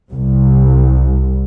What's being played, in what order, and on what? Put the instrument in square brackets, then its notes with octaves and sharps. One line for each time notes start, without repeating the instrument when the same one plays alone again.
[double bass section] C2